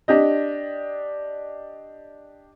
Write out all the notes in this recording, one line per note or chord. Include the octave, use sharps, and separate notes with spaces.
D4 G4 D#5